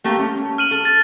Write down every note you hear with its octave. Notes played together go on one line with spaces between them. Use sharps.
A3 A#3 G4
C#4
F6 D#7 F#7
A4
A6